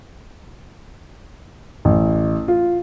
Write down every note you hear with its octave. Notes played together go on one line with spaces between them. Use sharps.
A1
F4